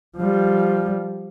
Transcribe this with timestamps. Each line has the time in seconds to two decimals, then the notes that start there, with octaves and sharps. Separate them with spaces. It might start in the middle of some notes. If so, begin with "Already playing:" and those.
0.17 F3 G3